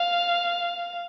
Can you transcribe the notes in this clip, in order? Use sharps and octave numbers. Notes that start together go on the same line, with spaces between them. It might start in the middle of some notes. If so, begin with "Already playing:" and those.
Already playing: F5